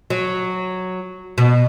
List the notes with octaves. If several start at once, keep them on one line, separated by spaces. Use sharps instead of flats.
F#3
B2